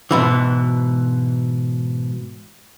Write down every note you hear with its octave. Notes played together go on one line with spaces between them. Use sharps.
G#2 B2 E3